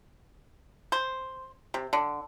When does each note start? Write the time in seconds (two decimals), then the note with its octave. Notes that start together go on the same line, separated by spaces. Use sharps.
0.92 C5
1.74 C3
1.93 D3